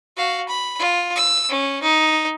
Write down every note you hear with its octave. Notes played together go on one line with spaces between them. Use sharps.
F#4 F5
B5
F4
E6
C#4
D#4